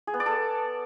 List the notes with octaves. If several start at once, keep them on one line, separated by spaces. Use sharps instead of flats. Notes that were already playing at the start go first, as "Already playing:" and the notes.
G#4
B3
D5
A4